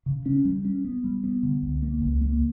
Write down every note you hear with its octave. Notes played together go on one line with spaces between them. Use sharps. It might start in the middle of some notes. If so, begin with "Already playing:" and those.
C#3
C#4
G3
C#4
B3
G3
B3
D3
C#2
A#3
C#2
A#3